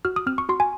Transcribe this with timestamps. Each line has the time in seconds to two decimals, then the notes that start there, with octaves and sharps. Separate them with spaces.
0.05 F#4 F6
0.16 D#6
0.26 C4 F6
0.38 C#6
0.49 F#4 C6
0.60 G#5